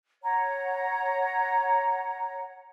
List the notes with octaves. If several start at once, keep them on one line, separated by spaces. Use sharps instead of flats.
C#5 F#5 A#5